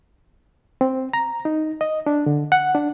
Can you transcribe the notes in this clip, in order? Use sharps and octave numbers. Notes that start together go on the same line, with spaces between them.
C4
A#5
D#4
D#5
D4
D3
F#5
D4